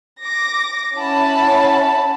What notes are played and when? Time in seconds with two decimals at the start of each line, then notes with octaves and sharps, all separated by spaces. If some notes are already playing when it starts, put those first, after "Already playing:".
0.25 D6 A#6
0.96 C#4 E4 F#5 A5 B5